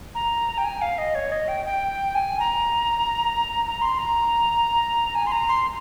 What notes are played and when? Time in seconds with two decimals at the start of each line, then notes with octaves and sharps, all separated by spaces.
0.15 A#5
0.58 G5
0.64 G#5
0.81 F5
0.98 D#5
1.15 C#5
1.32 D#5
1.48 G5
1.65 G5
2.15 G#5
2.40 A#5
3.66 A#5
3.82 C6
3.98 A#5
5.15 G#5
5.26 C6
5.32 A#5
5.48 C6